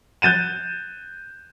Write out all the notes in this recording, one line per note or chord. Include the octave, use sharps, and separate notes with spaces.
F#6 G6 A6 D#7 E7